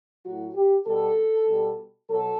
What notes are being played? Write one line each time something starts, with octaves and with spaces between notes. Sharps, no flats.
A2 F#3 F#4
G4
B2 G3 A4
B2 G3
B2 F#3 A4